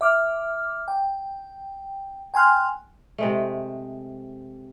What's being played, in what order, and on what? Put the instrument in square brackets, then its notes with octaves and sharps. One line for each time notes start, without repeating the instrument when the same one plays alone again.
[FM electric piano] E5 D6 F6
G5
G5 G#5 C6 F6 F#6
[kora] C3 G#3 A3